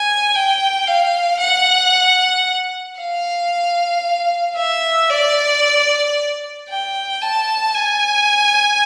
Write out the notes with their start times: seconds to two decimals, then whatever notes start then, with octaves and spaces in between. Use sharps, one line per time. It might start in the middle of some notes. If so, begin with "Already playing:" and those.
Already playing: G#5
0.35 G5
0.87 F5
1.40 F#5
2.99 F5
4.57 E5
5.10 D5
6.69 G5
7.22 A5
7.75 G#5